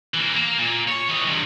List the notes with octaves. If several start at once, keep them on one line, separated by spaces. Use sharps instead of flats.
E3 A#3
A#3
A#2
C#5
E3 D#5
G2 C3